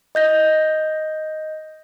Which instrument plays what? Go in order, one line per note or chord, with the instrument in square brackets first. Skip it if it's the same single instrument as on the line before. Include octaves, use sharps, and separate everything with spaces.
[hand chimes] D#5 G6 A#6